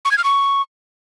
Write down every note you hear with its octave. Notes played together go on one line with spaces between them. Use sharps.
C#6
G#6
F6
C#6